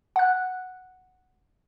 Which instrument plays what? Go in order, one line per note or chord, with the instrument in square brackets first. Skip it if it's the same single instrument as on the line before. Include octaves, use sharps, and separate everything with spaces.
[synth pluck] F#5 F#6